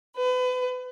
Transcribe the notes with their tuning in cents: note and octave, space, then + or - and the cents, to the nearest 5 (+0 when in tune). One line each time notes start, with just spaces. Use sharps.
B4 +35